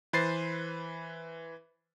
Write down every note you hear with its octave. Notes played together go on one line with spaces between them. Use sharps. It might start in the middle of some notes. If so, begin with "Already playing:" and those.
E3 B4 C5 A6 C7